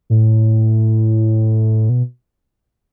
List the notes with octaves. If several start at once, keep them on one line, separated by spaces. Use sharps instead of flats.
A2
B2